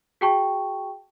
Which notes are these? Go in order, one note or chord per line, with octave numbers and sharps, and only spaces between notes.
F#4 G#4 G5 A5 C#6